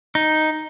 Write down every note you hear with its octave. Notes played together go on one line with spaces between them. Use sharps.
D#4